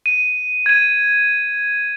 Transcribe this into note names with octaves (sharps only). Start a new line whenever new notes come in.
D#7
G#6 D#7